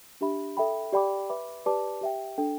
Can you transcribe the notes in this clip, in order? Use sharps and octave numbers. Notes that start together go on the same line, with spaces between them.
D4 G4 E5 B5
A4 E5 G5 B5
G4 D5 G5 B5 D6
B4 E5 B5 D6
G4 B4 D5 A5 D6
G4 E5 G5
D4 A4 G5